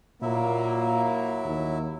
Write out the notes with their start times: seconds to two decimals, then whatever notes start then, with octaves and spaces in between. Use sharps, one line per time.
0.22 A#2 F#3 A#3 E4 E5
1.45 D#2